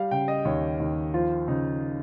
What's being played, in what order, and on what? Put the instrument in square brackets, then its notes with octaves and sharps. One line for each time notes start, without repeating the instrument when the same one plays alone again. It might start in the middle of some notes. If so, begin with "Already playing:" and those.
Already playing: [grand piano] G3 F5
C#3 G5
D#5
D#2 C#5
D#2
F3 F4
C#3 D#4